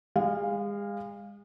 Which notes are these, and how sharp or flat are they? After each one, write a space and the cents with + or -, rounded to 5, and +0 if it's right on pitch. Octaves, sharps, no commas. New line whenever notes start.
G#3 -35 F5 +0